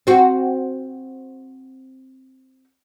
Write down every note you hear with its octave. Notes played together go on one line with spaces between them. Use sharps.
C4 F#4